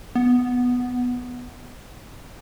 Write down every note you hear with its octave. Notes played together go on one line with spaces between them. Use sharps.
B3